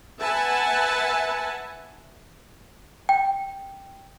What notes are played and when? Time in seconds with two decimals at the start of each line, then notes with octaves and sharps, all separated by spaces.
0.21 B4 E5 F#5 G#5 A5
3.09 G5